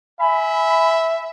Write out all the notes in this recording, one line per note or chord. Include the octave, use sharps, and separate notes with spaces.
E5 G#5 B5